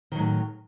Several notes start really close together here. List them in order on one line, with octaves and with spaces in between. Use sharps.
D#3 F#3 A2